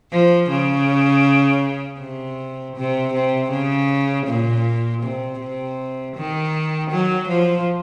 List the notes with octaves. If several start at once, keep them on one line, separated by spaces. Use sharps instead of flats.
F3
C#3
C3
C3
C3
C#3
A#2
C3
C3
D#3
F#3
F3